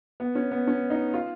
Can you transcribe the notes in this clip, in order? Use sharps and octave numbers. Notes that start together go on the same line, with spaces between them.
B3
C#4
B3
C#4
D#4
F4